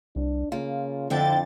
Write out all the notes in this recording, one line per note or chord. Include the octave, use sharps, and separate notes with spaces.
C2 D4
C#3 A#3 F4
F2 D3 C4 E4 G5 A6